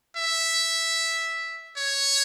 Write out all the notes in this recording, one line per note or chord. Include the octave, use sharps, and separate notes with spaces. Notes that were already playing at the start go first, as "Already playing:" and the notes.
E5
C#5